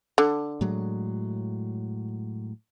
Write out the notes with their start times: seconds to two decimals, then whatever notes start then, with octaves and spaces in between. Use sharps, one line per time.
0.18 D3
0.61 A2 F#3 G#3